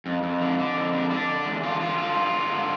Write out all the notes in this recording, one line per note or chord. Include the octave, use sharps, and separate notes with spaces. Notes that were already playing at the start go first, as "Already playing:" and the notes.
F2
F2
D3
D3
F2
D3
D3 D4
D3
E2
D3 F4
D3 F4
D3 F4
G2
G2
D3